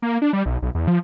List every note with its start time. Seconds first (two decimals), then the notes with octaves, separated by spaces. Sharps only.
0.02 A#3
0.22 D4
0.33 G3
0.46 B1
0.62 B1
0.75 E2
0.88 F3